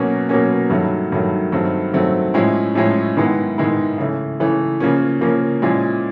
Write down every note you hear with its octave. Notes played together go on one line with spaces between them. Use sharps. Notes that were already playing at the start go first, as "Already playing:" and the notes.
Already playing: B2 F#3 A#3 C#4
B2 F#3 A#3 C#4
G2 D#3 F#3 A3
G2 D#3 F#3 A3
G2 D#3 F#3 A3 C4
G2 D#3 F#3 A3 C4
A2 F3 G#3 C#4 E4
A2 F3 G#3 C#4 E4
G#2 D#3 G#3 B3 E4
G#2 D#3 G#3 B3 E4
C#3 E3 A3
C#3 E3 A3
C#3 F3 A#3 C#4
C#3 F3 A#3 C#4
A#2 F3 G#3 C#4 E4